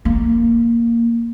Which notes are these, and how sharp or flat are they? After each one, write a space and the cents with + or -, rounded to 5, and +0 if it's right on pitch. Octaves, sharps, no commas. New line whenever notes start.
A#3 -5